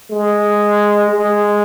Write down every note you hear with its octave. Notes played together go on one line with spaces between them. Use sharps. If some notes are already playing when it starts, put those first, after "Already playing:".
G#3
G#3